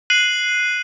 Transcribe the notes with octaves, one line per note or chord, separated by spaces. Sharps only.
F#6 C7 D#7 F#7